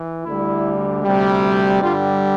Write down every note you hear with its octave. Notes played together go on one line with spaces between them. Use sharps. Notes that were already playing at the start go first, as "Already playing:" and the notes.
Already playing: E3
D2 D3 G3 E4
D2 C3 G3
G2 D3 G3 F4